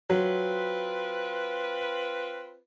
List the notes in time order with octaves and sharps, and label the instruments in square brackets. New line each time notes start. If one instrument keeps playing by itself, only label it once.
[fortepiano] F#3 [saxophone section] C4 F4 B4